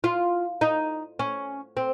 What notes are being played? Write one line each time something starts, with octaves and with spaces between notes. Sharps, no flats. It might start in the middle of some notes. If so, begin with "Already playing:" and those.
F4
D#4
C#4
C4